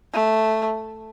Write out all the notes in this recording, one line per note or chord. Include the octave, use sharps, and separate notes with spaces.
A3